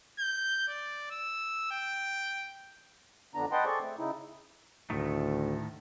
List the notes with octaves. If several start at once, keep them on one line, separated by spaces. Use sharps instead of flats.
G6
D5
E6
G5
F2 D3 B3 D4 A#5
B4 D#5 F#5 G5 A5 C6
G#4 A4 C5 D5 C#6
A3 C4
C#3 D#4 E4
D2 A2 D#3 A3